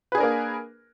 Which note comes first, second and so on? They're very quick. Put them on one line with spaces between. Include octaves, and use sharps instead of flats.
B4 G#4 D4 A#4 A#3